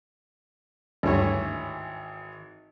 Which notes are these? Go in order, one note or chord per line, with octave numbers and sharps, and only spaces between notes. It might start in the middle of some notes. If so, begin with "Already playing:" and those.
G#1 D2 G2 E3 C#5